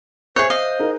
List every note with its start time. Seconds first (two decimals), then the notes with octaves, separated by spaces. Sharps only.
0.36 G#4 C5 C#5 E5 F#6 G6
0.50 D#5 F5
0.79 D#4 G#4 A#4